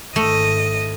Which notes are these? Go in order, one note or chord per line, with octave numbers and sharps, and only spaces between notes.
G#1 A3 D#5